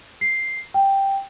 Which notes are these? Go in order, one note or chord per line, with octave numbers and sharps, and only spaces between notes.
C7
G5